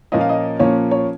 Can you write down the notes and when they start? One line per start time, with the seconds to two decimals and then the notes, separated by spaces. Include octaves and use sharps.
0.12 A#2 F3 A#3 C#4 D#5
0.21 F5
0.29 D#5
0.59 A#2 F3 A#3 C#4 C#5
0.91 C#5